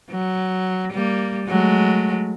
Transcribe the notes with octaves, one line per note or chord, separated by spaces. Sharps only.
F#3
G3 A#3
F#3 G#3 A3